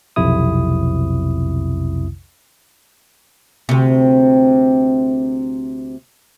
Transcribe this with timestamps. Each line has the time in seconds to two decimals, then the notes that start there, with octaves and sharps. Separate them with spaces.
0.16 B1 F2 C3 E4 D#6
3.69 D2 C3